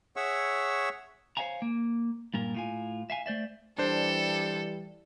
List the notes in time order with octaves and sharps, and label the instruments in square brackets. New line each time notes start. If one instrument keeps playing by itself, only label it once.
[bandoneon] G#4 C#5 E5 F#5 C#6 E6
[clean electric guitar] C5 C#5 E5 F5 G#5 A#5
A#3
G2 A#2 A#4
A2 F4 G#5
E5 F5 G#5
A3 C5 D5 E5
[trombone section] E3 G3 [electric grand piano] D4 C5 [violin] A4